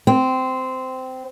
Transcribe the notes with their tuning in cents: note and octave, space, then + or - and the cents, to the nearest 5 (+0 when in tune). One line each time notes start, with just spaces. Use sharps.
C4 -15